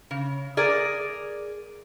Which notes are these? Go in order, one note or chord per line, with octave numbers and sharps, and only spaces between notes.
C#3
G#4 A#4 D5